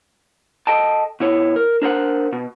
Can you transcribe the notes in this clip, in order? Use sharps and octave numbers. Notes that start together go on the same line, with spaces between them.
A4 D#5 G5 A5
B2 E4 C#5
A#4
D4 A#4 C5 F#5
B2